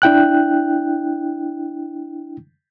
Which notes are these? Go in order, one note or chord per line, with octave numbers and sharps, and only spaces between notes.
D4 E4 G5 F#6